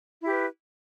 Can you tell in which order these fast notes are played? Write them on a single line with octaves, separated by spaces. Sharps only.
E4 G4 B4